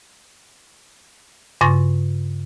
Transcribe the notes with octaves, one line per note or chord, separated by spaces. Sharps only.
G2 C#3 C6 C#6 A6 A#6